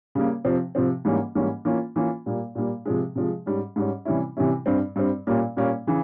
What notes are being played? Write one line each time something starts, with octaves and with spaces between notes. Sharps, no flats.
C#3 G3 A#3
C3 F3 C4
C3 F3 C4
G#2 E3 G3 A#3 C#4
G#2 E3 G3 A#3 C#4
E3 A#3 C#4 F4
E3 A#3 C#4 F4
A#2 G3 A#3
A#2 G3 A#3
C3 F3 G#3
C3 F3 G#3
G#2 G3 C#4
G#2 G3 C#4
C3 E3 G3 C#4 E4
C3 E3 G3 C#4 E4
G2 G3 C4
G2 G3 C4
A#2 G3 A#3 C#4
A#2 G3 A#3 C#4
C#3 E3